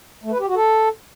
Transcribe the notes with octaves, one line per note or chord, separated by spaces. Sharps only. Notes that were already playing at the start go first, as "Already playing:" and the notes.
A3
B4
G4
F#4
A4